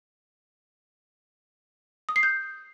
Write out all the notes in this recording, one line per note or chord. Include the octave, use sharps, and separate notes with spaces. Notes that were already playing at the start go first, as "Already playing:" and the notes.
D#6
C7
G6